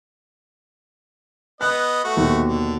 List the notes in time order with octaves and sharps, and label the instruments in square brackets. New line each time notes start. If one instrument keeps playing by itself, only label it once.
[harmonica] B3 D#5 [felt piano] F#6
[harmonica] A3 F#4
[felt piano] D#2 B2
[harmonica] D3